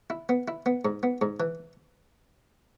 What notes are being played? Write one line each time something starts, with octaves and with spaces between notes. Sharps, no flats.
E4
B3
E4
B3
G#2
B3
G#2
E3